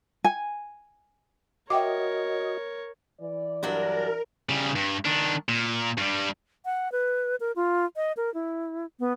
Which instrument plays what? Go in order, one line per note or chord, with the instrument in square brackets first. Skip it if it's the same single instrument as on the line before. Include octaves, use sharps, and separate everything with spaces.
[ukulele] G#5
[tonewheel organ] F#4 D#5 [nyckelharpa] A#4 C#5 [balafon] E5 G5 D6
[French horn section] E3 D5
[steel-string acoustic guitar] G2 F#3 D4 [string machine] A#4
[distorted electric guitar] C#3 G3
G2
D#3 D4
A#2
G2 G3
[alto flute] F#5
B4
A#4
F4
D#5
A#4
E4
B3